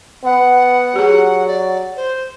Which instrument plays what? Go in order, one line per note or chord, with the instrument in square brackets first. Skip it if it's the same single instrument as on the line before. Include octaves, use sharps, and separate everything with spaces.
[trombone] B3 [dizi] F#5
[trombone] F#3 [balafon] G4 G#4
[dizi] D5
C5